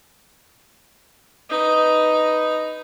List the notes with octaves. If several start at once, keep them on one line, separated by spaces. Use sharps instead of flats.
D#4 B4